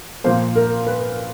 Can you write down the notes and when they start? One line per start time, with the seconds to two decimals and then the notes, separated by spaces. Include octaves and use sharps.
0.24 A#2 F3 A#3 C5
0.56 A#4
0.87 B4